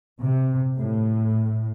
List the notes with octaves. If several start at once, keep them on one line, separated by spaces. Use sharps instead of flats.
C3
A2